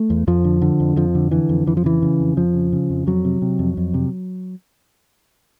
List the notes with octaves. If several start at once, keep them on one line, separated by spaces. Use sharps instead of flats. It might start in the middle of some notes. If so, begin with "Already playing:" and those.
Already playing: A3
E2
F2 F3
D3
D3
F2
F2 F3
D3
D3 E3
F2
F2 E3
F3
C#3 E3
C#3
F2
F2 F3
C#3
C#3
F2
F2 F#3
C3
C3
F2
F2
C3